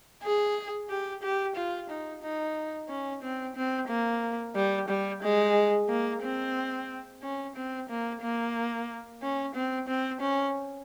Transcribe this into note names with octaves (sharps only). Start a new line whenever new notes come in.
G#4
G4
G4
F4
D#4
D#4
C#4
C4
C4
A#3
G3
G3
G#3
A#3
C4
C#4
C4
A#3
A#3
C#4
C4
C4
C#4